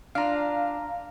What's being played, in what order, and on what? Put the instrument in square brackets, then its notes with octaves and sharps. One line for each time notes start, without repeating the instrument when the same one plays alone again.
[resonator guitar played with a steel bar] D4 F4 [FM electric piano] F5 A#5